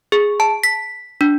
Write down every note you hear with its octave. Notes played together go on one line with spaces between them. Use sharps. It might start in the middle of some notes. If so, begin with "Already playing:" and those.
G#4
A5
B6
D4